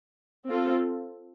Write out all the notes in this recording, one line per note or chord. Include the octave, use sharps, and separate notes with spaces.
C4 F4 A4